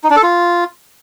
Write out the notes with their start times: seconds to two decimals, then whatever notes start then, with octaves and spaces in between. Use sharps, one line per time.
0.04 D#4
0.10 D4
0.17 A4
0.23 F4